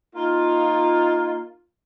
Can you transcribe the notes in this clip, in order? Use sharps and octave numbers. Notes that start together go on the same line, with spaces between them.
A#3 D#4 F4